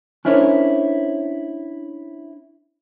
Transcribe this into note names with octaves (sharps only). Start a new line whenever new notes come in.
C#4 D4 E4 A#4 C5 C#5